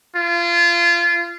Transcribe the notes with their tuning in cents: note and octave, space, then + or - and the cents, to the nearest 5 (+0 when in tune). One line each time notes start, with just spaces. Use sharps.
F4 -25